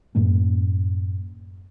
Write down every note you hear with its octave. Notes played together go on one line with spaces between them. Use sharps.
F#2 A2 A#3 C#4